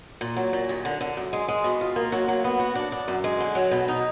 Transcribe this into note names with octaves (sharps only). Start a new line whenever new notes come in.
A#2
F#3
A#2
D#2
D3
D3
F#2
G#3
G#3
B2
F4
A#3
F#3
F#3
B3
F#4
D4
D4
F#2
G#3
D3
F#3
B2
D#4